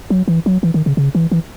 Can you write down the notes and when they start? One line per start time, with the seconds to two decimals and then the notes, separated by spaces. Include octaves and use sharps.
0.10 F#3
0.28 E3
0.46 F#3
0.63 E3
0.74 D#3
0.86 C#3
0.97 C#3
1.15 E3
1.32 E3